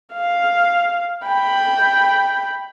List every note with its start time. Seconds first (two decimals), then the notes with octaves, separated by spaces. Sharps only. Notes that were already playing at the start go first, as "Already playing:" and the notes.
0.13 F5
1.26 G5 B5